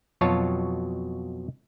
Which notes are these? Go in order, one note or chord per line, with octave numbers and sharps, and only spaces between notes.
F2 B2 F#3 F4 C#5 A5